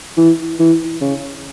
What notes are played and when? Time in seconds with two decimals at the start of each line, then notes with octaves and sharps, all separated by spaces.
0.17 E3
0.59 E3
1.01 C#3